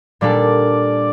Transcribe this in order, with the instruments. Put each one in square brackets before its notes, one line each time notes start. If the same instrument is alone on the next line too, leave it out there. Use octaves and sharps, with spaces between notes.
[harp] A#2 G3 A#3 D4 A4 [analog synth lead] D5